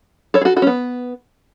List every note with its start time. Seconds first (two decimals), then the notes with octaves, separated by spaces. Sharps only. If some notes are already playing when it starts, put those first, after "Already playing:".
0.34 A4 C#5
0.41 G#4
0.45 F#4 A4
0.56 F#4 A4
0.62 C#4
0.67 B3